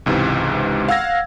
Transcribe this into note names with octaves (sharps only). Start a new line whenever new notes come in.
C#2 G#2 C3 E3
F5 F#5 E6 G#6 A#6